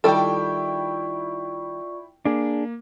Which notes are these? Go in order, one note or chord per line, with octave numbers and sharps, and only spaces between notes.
D#3 G3 E4 F4 A4 D5 G5 C#6
A#3 D4 G#4